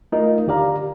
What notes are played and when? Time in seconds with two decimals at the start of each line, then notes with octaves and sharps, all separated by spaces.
0.12 A3 D#4 F4 A#4 D#5
0.46 D#2 D3 G4 D5 F5 A#5